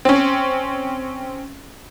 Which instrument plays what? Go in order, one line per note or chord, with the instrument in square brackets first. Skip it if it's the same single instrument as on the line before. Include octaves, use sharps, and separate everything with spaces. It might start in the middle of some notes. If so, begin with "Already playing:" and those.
[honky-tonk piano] C4 C#4